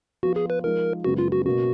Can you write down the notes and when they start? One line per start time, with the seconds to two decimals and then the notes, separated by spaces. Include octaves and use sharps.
0.23 F3 B3 F4 F#4
0.36 G#4
0.50 B4
0.64 F3 G#3 D#4 A#4
1.05 F#2 C#3 G#3 B3 F#4
1.18 F4
1.32 F#4
1.46 B2 A#3 C#4 F#4